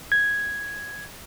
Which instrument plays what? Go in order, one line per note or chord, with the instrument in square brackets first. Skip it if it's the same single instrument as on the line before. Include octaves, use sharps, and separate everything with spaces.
[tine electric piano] G#6